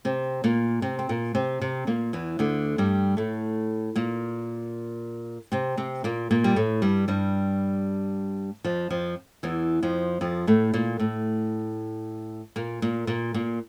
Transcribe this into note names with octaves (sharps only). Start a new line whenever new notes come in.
C3 C4
A#2 A#3
C3 C4
C4
A#2 A#3
C3 C4
C3 C4
A#2 A#3
E2 E3
D2 D3
G2 G3
A2 A3
A#2 A#3
C3 C4
C3 C4
A#2 A#3
A#2 A#3
G3
A2 A3
G2 G3
G2 G3
F2 F3
F2 F3
E2 E3
F2 F3
F2 F3
A2 A3
A#2 A#3
A2 A3
A#2 A#3
A#2 A#3
A#2 A#3
A#2 A#3